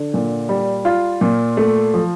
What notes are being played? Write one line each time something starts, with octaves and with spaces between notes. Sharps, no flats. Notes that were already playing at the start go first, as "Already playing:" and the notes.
Already playing: D3
A#2
G3
F4
A#2
A3
F3